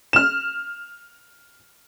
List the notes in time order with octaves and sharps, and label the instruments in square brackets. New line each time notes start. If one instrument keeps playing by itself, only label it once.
[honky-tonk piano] F6 E7